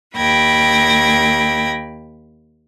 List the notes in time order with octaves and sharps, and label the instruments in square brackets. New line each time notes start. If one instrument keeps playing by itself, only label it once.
[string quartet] D#2 G5 B5 G#6 A#6